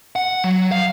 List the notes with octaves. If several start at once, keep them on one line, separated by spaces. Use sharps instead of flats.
F#5
F#3
F5